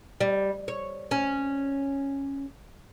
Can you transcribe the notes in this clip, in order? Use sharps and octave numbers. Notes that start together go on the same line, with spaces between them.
G3
C#5
C#4